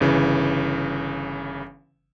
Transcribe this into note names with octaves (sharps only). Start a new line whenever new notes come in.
G1 C#3 E3